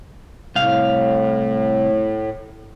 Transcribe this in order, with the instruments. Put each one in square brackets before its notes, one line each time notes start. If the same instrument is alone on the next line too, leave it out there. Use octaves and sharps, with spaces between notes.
[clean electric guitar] C2 F5 [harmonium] A2